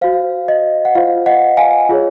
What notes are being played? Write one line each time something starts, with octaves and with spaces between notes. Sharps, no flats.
F#4 C5 F5
D#5
F#5
F4 C5 F5
D#5 F#5
F5 G#5
F4 G#4 C#5